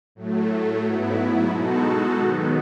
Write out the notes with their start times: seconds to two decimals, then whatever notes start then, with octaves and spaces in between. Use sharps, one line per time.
0.15 A2 F#3 A3
0.82 G#2 F#3 B3 E4
1.48 B2 G#3 D#4 F#4 A4
2.16 D#3 F#3 B3